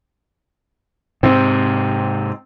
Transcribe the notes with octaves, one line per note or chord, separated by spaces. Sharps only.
G#2 C3 C4